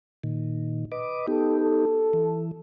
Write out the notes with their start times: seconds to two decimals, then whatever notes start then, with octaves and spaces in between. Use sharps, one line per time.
0.24 A#2 D#3
0.92 B4 D#5 D6
1.27 B3 D#4 G4 A4
1.61 A4
2.13 E3